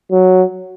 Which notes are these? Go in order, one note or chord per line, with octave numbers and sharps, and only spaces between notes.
F#3